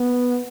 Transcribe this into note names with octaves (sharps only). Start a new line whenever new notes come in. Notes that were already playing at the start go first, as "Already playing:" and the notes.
Already playing: B3